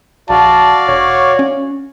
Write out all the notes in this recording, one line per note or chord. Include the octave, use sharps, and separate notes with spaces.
A#1 F#4 D5 F5 A5
E1 C#5
C#4